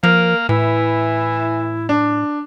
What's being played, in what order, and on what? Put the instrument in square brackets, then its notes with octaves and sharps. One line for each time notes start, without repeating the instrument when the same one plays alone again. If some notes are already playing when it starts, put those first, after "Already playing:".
[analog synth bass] F3 [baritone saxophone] A#3 [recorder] A#4
[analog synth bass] A2 [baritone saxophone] E3 [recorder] E4
[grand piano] D4